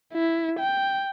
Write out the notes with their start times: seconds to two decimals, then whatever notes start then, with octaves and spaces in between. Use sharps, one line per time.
0.14 E4
0.60 G5